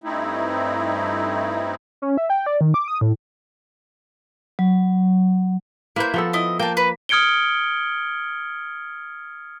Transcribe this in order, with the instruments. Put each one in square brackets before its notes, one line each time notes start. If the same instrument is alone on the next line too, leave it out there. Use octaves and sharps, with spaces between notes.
[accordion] G2 A3 C4 D#4 E4
[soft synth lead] C#4
E5
G5
D5
D#3
D6
D#6
A2
[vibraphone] F#3
[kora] A#3 B4 C5 [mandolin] E4 G6
[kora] F3 B3 A4
[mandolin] E4 D#5
[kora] A#3 [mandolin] G5 A5
[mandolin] B4
[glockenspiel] D#6 F6 G#6 C#7 D7 G7